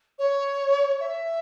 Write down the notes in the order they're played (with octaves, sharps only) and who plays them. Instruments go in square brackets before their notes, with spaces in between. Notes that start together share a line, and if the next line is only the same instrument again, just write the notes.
[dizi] C#5
E5